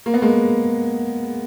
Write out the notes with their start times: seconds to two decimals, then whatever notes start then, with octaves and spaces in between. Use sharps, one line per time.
0.06 A#3
0.14 B3
0.22 G#3 A#3